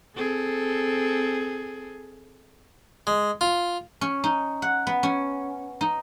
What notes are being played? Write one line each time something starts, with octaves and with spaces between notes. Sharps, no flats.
C4 G#4 A4
G#3
F4
C#4
D#4
F#5
B3
C#4
D#4